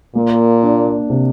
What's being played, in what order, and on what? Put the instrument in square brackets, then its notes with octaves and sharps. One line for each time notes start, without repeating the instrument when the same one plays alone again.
[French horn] A#2 [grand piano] A#3
[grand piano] D4
C3